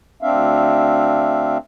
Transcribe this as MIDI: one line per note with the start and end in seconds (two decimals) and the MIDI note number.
0.22 1.58 38
0.22 1.58 60
0.22 1.58 62
0.22 1.58 76
0.22 1.58 77